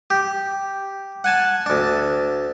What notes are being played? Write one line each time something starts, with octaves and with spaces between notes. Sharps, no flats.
G4
F#5 G#5 A5
D2 D4